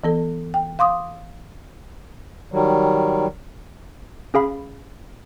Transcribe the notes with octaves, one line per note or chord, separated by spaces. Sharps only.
E3 B3 A4
G5
F5 C6 D6 D#6
D#3 F#3 G3
C#4 G#4 F5 B5